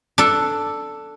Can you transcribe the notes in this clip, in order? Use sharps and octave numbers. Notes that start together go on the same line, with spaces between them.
D4 A4